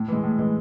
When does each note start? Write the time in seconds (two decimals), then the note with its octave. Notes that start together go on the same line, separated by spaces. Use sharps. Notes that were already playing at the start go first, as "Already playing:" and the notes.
Already playing: A2
0.08 E3 G#3
0.23 A2
0.39 E3 G#3